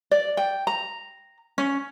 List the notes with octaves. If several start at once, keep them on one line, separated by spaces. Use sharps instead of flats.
D5
G5
A#5
C#4